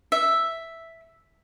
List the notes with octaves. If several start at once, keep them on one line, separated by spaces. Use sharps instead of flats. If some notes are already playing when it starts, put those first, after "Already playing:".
E5